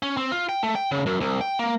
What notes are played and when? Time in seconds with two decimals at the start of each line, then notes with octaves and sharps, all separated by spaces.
0.03 C#4
0.17 C4
0.32 F4
0.49 G5
0.63 A3
0.75 G5
0.91 C#3
1.06 F#2
1.20 C2
1.41 G5
1.59 A#3